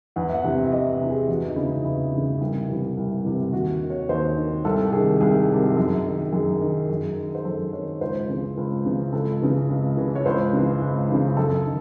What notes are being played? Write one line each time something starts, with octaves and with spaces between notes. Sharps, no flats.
E2 F#5
E5
F#5
C3 E3
E5
E2 D#5
C3 E3
G#4
E2 F#4
D#4
C#3 E3 E4
E2 E4
C#3 E3
C2
C3 E3
C2
C3 E3
D#2 F#4
D#3
C#5
D#2 C5
D#3
C2 A4
C3 D#3 G#4
C2 G#4
C3 D#3
F#2
D#3
F#2 G#4
D#3
F#2
D#3
C5
F#2 A4
D#3 C#5
C#2 C5
C#3 E3
C#2
C#3 E3
C#2 A4
C#3 E3
C#2
C#3 E3
C#5
C#2 C5
C#3 E3
C#2
C#3 E3
F#2 A4
D#3